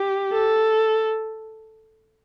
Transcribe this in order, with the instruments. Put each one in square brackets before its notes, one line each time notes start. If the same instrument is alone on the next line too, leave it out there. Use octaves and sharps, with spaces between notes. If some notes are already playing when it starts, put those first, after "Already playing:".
Already playing: [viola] G4
A4